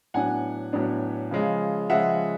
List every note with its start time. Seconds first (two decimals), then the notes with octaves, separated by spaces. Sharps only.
0.14 A2 F#3 B3 D4 F#5 G#5
0.73 A2 F#3 B3 D4
1.31 C#3 F3 G#3
1.89 C#3 F3 G#3 E5 F#5